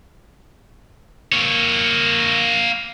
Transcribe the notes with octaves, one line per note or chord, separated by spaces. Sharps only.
A#3 C#5